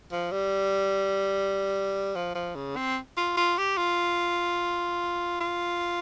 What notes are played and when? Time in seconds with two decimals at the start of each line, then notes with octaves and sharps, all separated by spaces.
0.12 F3
0.32 G3
2.15 F3
2.35 F3
2.55 C#3
2.76 C4
3.17 F4
3.37 F4
3.58 G4
3.78 F4
5.40 F4